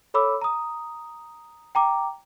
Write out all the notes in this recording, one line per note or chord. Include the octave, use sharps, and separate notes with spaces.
A4 C#5 B5 D6 E6
A#5 D#6
G5 A#5 D6